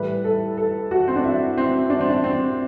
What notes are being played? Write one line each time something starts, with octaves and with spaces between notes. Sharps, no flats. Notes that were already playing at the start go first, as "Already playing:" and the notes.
Already playing: A2 E3 G3 B4
A4
A4
F#4
C4
D4
E4
C4
D4
C4
D4
C4